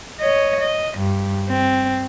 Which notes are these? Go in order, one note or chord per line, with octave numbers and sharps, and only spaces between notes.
C#5 D#5
D#5
G2
C4